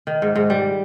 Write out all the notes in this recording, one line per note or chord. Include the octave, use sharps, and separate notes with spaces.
D#3
G#2
G#2
G3